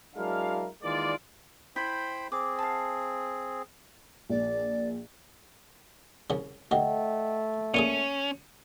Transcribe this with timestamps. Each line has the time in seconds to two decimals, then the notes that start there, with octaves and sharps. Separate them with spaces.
0.16 F#3 G#3 D4 E4 A#4 F5
0.83 D#3 E3 G#3 A#3 F4 D5
1.76 E4 C5 G5 B5
2.32 C4 G#4 D6
2.59 F5 A5
4.30 A#1 D5
6.30 C2 C#3
6.71 D2 C3 A3 D#5 F#5 G5
7.74 A#2 C#4 F4 G#4 C#7 D#7